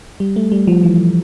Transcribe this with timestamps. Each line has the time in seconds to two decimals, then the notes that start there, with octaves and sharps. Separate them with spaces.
0.20 G3
0.36 A3
0.52 G3
0.67 F3
0.83 E3